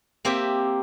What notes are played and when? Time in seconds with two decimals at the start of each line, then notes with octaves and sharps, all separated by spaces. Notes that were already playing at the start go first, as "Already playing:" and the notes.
0.25 A#3 C4 G4 E5